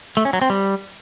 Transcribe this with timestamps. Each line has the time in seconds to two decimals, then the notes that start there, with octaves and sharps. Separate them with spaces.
0.17 A3
0.25 C#4
0.33 F#3
0.42 C4
0.50 G3